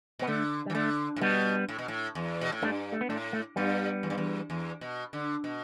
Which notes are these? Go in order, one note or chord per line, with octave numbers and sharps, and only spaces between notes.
B2
B3
D3 A3
G3
E3
D3 A3
A2
B2 G3 B3
A2
B2
A2
E2
B2
A2
G2 A3 D4
A3
B3
A2 A3 D4
A3
G2 G3 B3
E2
G2
E2
E2
B2
D3
B2